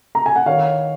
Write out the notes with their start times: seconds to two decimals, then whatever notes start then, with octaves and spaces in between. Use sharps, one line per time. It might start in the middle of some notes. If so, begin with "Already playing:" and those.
0.15 A#5
0.26 G#5
0.36 F#5
0.46 D#3 C#5 F5